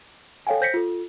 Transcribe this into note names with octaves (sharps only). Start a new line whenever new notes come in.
A4 C#5 F5 G5 G#5
C5 G6 A#6 B6 C#7
F4 A4